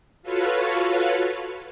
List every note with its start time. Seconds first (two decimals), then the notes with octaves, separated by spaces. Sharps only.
0.23 F4 F#4 A4 B4 C#5 F5